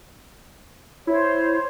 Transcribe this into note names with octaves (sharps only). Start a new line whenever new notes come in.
E4 C5 C#5